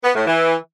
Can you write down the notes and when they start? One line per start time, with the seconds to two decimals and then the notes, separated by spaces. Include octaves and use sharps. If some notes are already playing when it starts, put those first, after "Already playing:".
0.04 B3
0.15 A2
0.27 E3